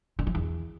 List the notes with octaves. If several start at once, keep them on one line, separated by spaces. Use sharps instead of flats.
D3
F3
E2